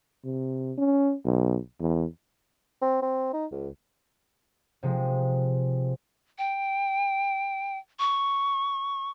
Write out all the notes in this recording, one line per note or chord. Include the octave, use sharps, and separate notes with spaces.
C3
C#4
B1
E2
C4
C4
D#4
C#2
C3 F3 G#3
G5
C#6